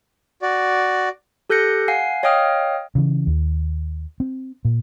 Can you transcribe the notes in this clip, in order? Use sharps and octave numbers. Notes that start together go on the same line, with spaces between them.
F#4 D5
G4 A4 F#6 G6 A#6 C#7
F5 F#5 G#5 C7
C#5 D#5 F5 G5 D#6 F6
C#3 E3
D#2
C4
A#2